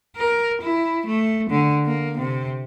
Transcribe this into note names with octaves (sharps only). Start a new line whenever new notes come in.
A#4
E4
A3
D3
A#3
C3